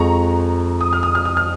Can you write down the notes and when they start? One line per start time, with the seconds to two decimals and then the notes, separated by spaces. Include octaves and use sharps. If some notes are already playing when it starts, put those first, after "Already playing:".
Already playing: F2 F3 G#3 A#5 C#6
0.81 D#6
0.93 F6
1.03 D#6
1.15 F6
1.25 D#6
1.37 F6